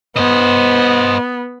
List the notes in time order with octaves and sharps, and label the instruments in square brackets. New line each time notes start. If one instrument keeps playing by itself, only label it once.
[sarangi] B3 [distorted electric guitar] C5 D#5